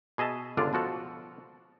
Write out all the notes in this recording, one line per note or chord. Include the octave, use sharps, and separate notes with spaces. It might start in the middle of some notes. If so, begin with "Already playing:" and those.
B2 G#4 D#5 E5 A5
G1 C#2 D3 D4 F4 D5
B2 F3 F#4 A4